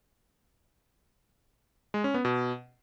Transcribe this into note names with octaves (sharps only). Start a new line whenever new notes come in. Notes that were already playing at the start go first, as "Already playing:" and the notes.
G#3
C#4
B3
B2